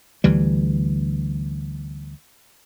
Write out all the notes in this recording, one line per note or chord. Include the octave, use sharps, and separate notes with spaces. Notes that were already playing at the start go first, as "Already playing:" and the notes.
D2 E3 G3